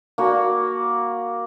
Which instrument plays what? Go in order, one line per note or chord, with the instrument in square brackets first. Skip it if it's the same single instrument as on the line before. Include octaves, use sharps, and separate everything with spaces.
[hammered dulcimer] A#3 F#4